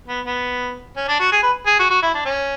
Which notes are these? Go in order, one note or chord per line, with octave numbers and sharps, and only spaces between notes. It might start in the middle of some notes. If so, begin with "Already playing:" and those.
B3
B3
C#4
D4
F#4
G#4
B4
G#4
F#4
F#4
E4
D4
C#4